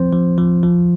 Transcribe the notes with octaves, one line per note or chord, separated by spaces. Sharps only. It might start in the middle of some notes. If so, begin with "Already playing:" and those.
Already playing: F3 C4 C5
F3
F3
F3